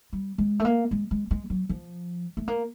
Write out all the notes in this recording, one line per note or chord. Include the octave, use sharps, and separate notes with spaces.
G3
G#3
A3
A#3
G#3
G#3
G#3
F#3
F3
A3
A#3